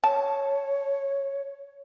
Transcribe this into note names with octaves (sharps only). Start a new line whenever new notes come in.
C#5 A5